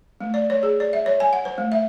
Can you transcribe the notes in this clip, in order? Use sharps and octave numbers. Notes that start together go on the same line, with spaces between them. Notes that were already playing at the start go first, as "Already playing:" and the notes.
A3
D5
C#5
G#4
D5
E5
C#5
G#5
F#5
C5
A3
E5